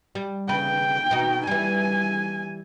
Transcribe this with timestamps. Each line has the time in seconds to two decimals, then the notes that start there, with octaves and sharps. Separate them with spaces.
0.15 G3
0.49 C#3 B4 G5
1.11 B2 D#4
1.47 E3 G3 G#5